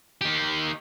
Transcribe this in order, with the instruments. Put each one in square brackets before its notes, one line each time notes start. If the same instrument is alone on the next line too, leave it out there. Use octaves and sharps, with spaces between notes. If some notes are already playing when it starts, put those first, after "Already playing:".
[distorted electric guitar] D#3 G4